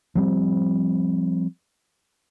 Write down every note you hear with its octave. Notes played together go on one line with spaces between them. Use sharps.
F3 G3 C4